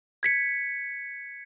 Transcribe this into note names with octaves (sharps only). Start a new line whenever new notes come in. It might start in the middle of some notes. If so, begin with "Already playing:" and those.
G#6 B6 C#7